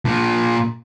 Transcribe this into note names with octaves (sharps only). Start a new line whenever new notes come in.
A#2 D4